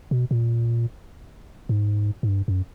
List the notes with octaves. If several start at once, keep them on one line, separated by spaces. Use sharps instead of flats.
B2
A#2
G#2
G#2
G2
F#2